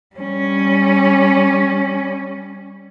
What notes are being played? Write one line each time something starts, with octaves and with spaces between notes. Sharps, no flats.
G3 C#4